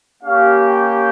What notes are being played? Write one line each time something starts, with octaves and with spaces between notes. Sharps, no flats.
A#3 C#4 G4 F5
G5